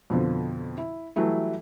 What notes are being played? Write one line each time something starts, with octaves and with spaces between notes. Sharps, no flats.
F2 B2 D3 F3
E4
E3 F#3 G3 A3 E4